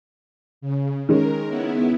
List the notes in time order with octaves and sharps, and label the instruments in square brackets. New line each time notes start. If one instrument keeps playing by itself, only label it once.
[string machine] C#3
[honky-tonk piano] D#3 G#3 C#4 [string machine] A#4
[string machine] B3 E4